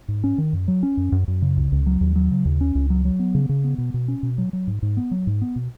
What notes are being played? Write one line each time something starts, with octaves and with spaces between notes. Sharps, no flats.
G#2
C#4
D#3
F#2
F#3
C#4
F#2
F#2
F#2
C#3
C#2
C#2
F#3
D#2
F#3
C#3
D#2
C#4
C#2
F#3
F#3
B3
C#3
C#3
B3
B2
B2
C#4
B2
F#3
F#3
G#2
G#2
B3
F#3
G#2
B3
B2